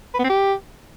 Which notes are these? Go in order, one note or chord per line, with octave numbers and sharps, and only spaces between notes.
B4
B3
C4
G4